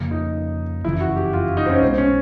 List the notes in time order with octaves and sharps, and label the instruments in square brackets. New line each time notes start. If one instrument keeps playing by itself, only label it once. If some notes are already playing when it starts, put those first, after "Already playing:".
Already playing: [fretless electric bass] F2 C#3 F3 A#3
[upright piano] D#4
[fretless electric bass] F#1 F2 C#3 E3 [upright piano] E4
[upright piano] F#4
G4
F4
D#4
C4
C#4
[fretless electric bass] B1 B2 G#3 B3 [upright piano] C4
[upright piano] C#4